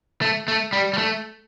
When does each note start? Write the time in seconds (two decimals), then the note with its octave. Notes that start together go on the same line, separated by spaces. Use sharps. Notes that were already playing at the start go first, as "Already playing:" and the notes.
0.22 A3
0.48 A3
0.73 G3
0.93 G3
0.98 A3